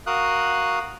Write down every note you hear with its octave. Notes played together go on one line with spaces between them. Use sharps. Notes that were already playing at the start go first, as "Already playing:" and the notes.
F#4 A#4 F5 D#6 F#6